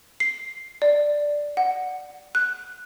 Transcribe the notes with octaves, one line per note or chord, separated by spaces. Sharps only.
C7
D5
F#5
F#6